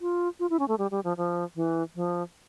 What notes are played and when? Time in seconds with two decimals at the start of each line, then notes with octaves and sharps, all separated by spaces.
0.01 F4
0.40 F4
0.50 E4
0.59 C#4
0.68 A3
0.78 G3
0.91 G3
1.04 F3
1.17 F3
1.56 E3
1.95 F3